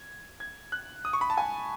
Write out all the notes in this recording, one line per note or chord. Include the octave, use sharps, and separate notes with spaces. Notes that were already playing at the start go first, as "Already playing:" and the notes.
Already playing: G#6
G#6
F#6
D#6
C#6
B5
A5
G#5